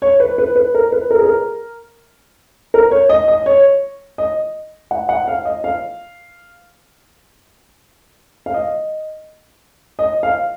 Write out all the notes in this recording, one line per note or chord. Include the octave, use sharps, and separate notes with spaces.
C#5
B4
B4
B4
A#4
B4
A#4
G#4
A#4
A#4
C#5
D#5
D#5
C#5
D#5
F#5
F#5
F5
D#5
F5
F5
D#5
D#5
F5